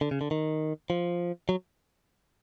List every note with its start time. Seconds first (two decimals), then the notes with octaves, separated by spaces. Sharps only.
0.01 D3
0.11 C#3
0.21 D3
0.31 D#3
0.90 F3
1.49 F#3